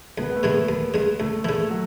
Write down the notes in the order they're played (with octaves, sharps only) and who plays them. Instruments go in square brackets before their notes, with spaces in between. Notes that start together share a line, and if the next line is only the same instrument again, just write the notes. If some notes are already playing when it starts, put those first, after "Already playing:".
[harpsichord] C#2 [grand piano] B3
[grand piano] B3
A3
[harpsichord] C#3 E3 G#3
[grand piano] B3
[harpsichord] D#2
C#3 G#3
[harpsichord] C#2 [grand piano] A3
[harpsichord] C#3 E3 [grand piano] A3
[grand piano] F#3